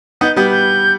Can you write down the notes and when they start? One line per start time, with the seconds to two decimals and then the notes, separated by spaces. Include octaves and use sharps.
0.21 B3 D#4 G6
0.36 G3 B3 G6
0.52 G6